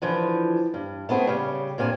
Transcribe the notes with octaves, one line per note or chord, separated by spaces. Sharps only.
D3 E3 F3
G2
A3 B3 C4 G#4
C#3 G3
G2 A#2 C4 G#5